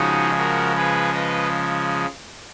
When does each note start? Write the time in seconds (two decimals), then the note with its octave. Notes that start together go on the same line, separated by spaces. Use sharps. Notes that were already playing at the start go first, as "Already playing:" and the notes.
Already playing: C#3 F3 G#3 D#4 F#4
0.38 F#4 A#4
0.77 G#4 B4
1.14 B4 D#5